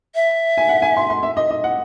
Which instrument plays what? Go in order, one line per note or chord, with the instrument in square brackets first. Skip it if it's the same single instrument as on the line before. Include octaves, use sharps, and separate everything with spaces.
[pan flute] E5
[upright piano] G#5
F#5
G#5
C6
C6
E5
D#5
D#5
F#5